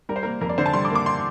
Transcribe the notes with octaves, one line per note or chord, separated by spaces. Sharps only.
G3 A#4
C5
A#3 A#4
F2 A#4
D5
D3 C5
A5
G3 C6
D6
A#3
D6
C6